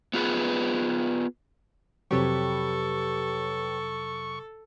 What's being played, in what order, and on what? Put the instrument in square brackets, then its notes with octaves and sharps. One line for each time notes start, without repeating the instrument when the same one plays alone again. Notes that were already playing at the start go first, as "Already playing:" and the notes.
[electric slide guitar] B3 F4 G#4 B4
[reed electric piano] F2 C3 F#3 [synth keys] G4 B4 C#5 [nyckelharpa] A4 [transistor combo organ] C#6